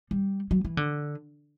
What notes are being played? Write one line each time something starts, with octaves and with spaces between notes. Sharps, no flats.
G3
F#3
E3
D3